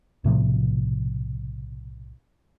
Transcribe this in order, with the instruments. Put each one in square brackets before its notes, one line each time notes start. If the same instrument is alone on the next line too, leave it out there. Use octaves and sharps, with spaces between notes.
[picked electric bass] B1 A2 C3 F3